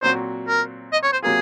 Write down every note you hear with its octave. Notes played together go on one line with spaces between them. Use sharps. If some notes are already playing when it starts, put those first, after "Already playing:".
A#2 F#3 C4 F#4 C5
A#4
D#5
C#5
C5
C3 F#3 A#3 F4 G#4